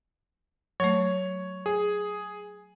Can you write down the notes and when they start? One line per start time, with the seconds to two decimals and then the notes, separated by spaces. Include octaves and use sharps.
0.80 F#3 A3 C#5
1.66 G#4